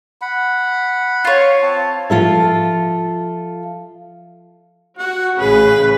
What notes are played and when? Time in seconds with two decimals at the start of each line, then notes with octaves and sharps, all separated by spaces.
0.21 F#5 B5
1.25 F4 C#5
1.62 C4 A5
2.10 F3 F4 A4 E5
4.98 F#4 F#5
5.38 A1 C#3 G#4 B4